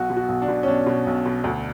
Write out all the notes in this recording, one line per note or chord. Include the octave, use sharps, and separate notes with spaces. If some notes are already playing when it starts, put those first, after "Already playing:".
Already playing: B1 F#4
B2
F#4
B1
D4
B2
C#4
B1 D4
B2
B1
B2
D2